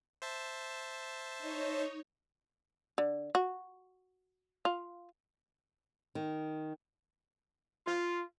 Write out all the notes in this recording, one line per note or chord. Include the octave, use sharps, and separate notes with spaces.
C5 E5 A5
D#4 C#5
D3
F#4
F4
D#3
F4